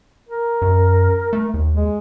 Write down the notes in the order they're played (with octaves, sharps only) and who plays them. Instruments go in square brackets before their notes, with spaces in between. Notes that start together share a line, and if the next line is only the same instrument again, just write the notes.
[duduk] A#4
[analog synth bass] F#2
A3
D#2
[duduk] G#3